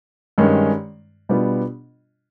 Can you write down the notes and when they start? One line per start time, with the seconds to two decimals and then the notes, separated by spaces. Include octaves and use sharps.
0.38 G2 D#3 G#3 C#4
1.29 B2 G3 B3 D4 F4